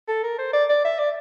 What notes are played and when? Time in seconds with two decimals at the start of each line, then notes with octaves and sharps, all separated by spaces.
0.08 A4
0.23 A#4
0.39 C5
0.53 D5
0.69 D5
0.85 E5
0.99 D5